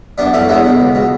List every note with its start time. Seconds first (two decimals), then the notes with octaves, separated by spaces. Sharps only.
0.18 F#2 B3 D4
0.33 E3 A3 C#4
0.49 E2 G#3 B3
0.64 B2
0.80 C#2
0.95 B2